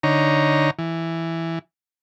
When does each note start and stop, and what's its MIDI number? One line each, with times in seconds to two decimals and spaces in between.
0.03 0.70 50
0.03 0.70 63
0.03 0.70 73
0.03 0.70 82
0.79 1.59 52